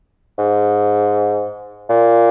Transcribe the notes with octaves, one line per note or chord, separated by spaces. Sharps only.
G#2
A#2